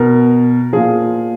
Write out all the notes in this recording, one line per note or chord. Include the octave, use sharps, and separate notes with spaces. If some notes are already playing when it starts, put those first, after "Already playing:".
Already playing: B2 A#4
A#2 F3 G#4